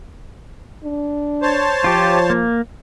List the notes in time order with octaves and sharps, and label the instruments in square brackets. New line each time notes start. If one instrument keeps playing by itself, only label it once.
[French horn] D4
[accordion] C5 C#5 A5
[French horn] F3 [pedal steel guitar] F4 G4
[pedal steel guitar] A#3